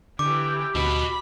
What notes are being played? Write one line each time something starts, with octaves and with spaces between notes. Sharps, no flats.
D3 E3 G4 D6
D2 F#4 D#5 B5